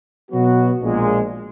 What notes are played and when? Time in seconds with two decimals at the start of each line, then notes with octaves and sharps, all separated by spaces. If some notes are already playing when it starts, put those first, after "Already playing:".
0.31 B2 F#3 B3 F#4
0.81 A#1 A#2 G#3